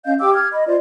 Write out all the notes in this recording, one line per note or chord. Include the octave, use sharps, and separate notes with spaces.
C#4 D#5 F5 G6
G4 G5 D6 E6
F6 G#6
D#5 B5
F4 C5 D5